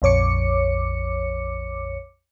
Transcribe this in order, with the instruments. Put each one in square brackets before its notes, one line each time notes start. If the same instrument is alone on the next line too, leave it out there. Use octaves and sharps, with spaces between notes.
[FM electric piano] A#1 F2 C#5 D6 C#7